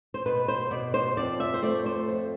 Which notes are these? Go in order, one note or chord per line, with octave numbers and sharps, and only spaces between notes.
C5
B2 B4
C5
B2 D5
C5
F2 D5
E5
C5
A3 D5
C5
F2